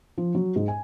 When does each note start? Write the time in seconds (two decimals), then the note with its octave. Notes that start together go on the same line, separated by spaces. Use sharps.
0.18 F3
0.35 F#3
0.56 G#2
0.68 G#5